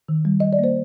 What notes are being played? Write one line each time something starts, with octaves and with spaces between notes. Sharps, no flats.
D#3
G3
G3 D#5
D5
A#3 C5